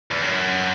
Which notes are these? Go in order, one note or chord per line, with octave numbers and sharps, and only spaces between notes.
E2
F#2